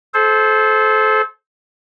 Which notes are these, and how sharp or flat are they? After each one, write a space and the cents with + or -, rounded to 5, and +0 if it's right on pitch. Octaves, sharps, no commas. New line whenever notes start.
A4 -30 C5 +0